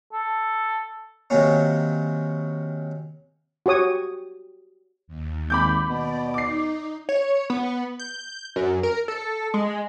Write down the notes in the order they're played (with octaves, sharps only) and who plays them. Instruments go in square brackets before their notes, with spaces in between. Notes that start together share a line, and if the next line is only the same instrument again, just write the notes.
[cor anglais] A4
[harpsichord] C3 D#3 F#3 A#3 C#4
[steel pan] F#4 G4 C#5 D#6
[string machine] D#2
[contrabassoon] G#1 [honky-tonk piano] B5 D6 G6
[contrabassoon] B2 [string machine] D5
[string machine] D#4 [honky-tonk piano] D6 C7
[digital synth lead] C#5
B3
G6
F#2
A#4
A4
G#3